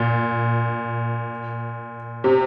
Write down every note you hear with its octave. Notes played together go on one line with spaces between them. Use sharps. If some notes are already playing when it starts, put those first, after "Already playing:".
Already playing: A#2
C3